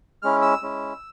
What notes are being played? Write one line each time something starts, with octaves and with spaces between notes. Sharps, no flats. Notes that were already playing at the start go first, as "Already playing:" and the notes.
G#3 C#4 E4 F6
E6
G#3 C#4 E4